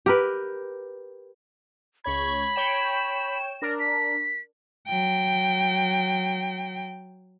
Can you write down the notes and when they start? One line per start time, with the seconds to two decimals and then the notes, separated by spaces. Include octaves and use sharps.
0.06 G4 A#4 B4
2.04 C#2 C#5 B5 G#6
2.56 C#5 G5 E7
3.62 D4 A#4 A#6
3.79 B6
4.88 F#3 G5